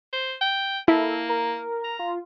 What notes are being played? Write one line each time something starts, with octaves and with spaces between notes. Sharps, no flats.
C5
G5
A#3 E4 A4
A#4
A#5
F4